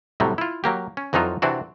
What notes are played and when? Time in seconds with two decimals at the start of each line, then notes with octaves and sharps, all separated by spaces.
0.20 A2 C3 F#3 G3 A3
0.38 E4 F4
0.64 F#3 A#3 G4
0.97 C#4
1.13 F2 E3 F#3 D#4 F4 A4
1.42 C3 E3 C4 D4 F#4